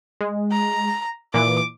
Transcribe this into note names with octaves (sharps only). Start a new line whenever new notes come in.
G#3
A#5
A#2 E3 D6